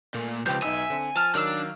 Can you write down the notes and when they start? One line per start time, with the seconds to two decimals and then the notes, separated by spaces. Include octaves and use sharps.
0.14 A#2 A3 A#3
0.46 C#2 G2 F3 C4 G4 B4 G6
0.62 B1 D#4 B4 E5 G#5
0.90 D3 C4
1.16 F3 A5 F6
1.35 D#3 F#3 D4 F5 E6